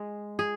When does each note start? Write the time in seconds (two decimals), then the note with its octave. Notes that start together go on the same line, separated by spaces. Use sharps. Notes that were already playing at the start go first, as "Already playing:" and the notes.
Already playing: G#3 G#4
0.39 G#4